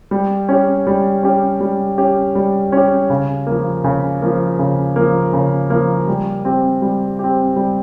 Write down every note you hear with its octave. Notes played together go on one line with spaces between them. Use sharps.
G3
C#4 G4
G3
C#4 G4
G3
C#4 G4
G3
C#4 G4
C#3
F3 A#3
C#3
F3 A#3
C#3
F3 A#3
C#3
F3 A#3
G3
C4 G4
G3
C4 G4
G3